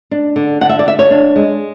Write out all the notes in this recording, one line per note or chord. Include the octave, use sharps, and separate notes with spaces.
D4
D3
D3 F#5
E5
D5
D3 E5
C#5
D4
G#3